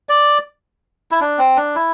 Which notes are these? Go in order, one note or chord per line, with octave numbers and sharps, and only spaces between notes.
D5
E4
D4
C4
D4
E4